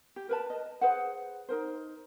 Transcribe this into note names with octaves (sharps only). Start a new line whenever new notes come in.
G4
A#4 B4 A5
D#5
G#4 B4 C5 F#5
D#4 A#4 C5